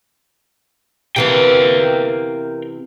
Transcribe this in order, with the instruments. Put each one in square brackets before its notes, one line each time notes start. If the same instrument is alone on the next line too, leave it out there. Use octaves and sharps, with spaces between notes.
[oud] C3 E3 B3 [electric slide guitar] A#4 F5 G5